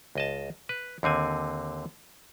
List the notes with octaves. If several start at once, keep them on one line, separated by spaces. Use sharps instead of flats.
C#2 D#5 A5
B4
D#2 D3 C4 G#5